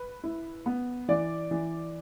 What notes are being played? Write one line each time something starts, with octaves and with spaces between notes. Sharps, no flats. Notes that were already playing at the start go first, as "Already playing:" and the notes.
Already playing: B4
E4
B3
E3 D5
E3